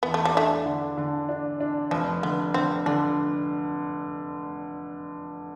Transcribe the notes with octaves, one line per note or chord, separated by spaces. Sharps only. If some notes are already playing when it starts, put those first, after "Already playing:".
E2 B3
A3
G3
A3 D4
D3
D3
D4
D4
F1 F3
D3 B3
D3 C4
D3 D4